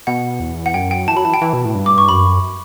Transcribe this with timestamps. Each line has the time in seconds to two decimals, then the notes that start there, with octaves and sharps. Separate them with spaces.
0.07 B2 F#5
0.40 E2
0.66 F#5
0.74 F#2 G5
0.91 G5
1.08 E3 A5
1.16 F#3 B5
1.25 E3 A5
1.34 G5
1.41 E3
1.53 B2
1.65 A2
1.75 G2
1.86 D6
1.98 C#6
2.09 F#2 B5